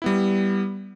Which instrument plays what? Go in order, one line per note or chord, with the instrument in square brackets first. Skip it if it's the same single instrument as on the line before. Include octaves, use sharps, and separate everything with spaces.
[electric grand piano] G3 B3 E4